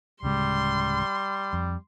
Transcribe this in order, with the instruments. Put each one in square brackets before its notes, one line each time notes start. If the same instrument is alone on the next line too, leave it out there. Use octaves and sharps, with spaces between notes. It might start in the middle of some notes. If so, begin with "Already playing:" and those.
[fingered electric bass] D1 C#3 G#3 [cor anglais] G3 [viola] C6
[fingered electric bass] F2